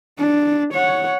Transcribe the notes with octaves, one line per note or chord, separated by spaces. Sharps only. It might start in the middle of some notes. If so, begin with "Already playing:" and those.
D4
C#5 F#5